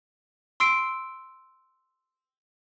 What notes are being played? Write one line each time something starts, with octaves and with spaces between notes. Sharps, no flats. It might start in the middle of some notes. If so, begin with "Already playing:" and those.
C6 E6 C7 D7